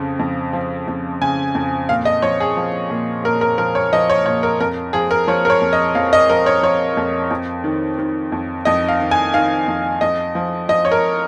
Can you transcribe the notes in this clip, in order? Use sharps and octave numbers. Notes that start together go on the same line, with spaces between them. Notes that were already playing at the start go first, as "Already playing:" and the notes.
Already playing: F2 C#3 F3
F2
F3
F2
C#3 G#5
F2
A#2 F5
D#5
F3 C#5
G#4
F3
A#2
A#2 A#4
A#4
F3 A#4
C#5
F3 D#5
C#5
A#2 C#5
A#4
F2 A#4
F3 G#4
A#4
F3 C#5
A#4
C#5
F2
D#5
F2 F5
D#5
F3 A#4
C#5
F3 C#5
F2
F2
D#3
D#3
F2
F2 D#5
F5
D#3
G#5
D#3 F5
F2
F2 D#5
F3
F3 D#5
C#5
A#4